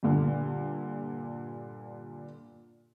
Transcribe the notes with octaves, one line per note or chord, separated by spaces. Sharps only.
G2 A#2 D3